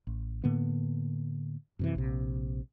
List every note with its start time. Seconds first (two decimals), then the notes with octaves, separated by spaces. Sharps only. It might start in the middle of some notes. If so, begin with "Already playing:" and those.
0.07 A1
0.44 A2 D3 A#3 B3
1.79 F#2 C3 E3
1.95 A#1 C3